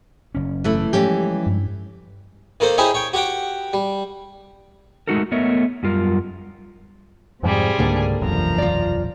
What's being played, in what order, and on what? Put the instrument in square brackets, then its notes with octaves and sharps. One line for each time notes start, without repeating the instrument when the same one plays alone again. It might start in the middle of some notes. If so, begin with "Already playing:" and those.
[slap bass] F#1 C#4
[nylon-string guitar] E3 A3 E4
[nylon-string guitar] E3 C#4 G4 [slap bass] F3 G3 G#3
[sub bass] G2
[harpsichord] D#3 A#3 A4 C5
C#4 D#4 E4 G4 G#4 C5
C#5 G5
F#4 G4 F#5 G5
G3
[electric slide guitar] G#3 A3 D#4 F#4 A4 A#4
A3 B3 A#4 C#5 D#5 E5
F#2 G3 F4 A#4
[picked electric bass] F2 G#2 F3 [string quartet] C3 G3 G#4
[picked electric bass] C#2 G#2 D3 [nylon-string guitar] A#3 D4 A4
[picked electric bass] E1 C2 F#2 [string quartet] E3 F3 A#5
[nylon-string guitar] F4 D5